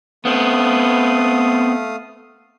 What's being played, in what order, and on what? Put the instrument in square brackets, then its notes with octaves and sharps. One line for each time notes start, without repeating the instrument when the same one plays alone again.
[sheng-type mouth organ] A3 F5 D#6 [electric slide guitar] B3 C4